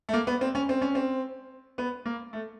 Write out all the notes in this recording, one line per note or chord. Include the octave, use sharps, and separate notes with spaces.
A3
A#3
B3
C4
C#4
C4
C#4
C4
B3
A#3
A3